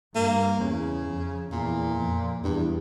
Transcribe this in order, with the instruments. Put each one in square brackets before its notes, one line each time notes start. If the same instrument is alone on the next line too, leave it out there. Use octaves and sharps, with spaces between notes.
[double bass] G2 [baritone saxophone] A#3
[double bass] E2 [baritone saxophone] C#3
[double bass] F2
[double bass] E2 [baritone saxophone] A#2
[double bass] F2
[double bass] E2 [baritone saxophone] G2